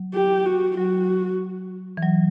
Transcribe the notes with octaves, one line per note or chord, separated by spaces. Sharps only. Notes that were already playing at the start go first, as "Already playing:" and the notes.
Already playing: F#3
G4
F#4
F#3 F#4
E3
F#3